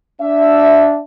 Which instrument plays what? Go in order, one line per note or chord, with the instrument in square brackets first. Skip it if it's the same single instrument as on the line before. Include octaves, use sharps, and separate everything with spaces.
[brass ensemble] D4 E5